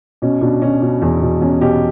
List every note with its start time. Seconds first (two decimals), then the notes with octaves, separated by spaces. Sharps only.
0.22 B2 C#4
0.41 B2 D4
0.62 B2 C#4
0.82 B2
1.02 E2
1.21 B2
1.41 E2 C#4
1.61 B2 G4